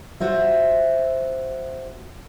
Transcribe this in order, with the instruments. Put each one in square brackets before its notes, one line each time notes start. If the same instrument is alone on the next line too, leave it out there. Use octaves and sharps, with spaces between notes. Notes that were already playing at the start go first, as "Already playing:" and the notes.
[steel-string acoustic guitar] F4 F#4 C5 E5